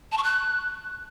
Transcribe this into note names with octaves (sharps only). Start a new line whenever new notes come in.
A5
C#6
F#6